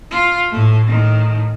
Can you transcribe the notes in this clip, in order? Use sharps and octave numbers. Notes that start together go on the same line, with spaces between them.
F4
A2 A3
A2 D#3